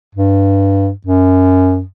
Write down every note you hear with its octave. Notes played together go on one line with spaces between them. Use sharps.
G2
F#2